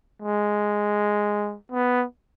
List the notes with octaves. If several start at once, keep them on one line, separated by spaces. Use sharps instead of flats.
G#3
B3